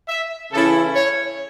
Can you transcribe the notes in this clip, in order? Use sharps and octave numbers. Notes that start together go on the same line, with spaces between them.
E5
C#3 E3 C#4 E4 A4
C#5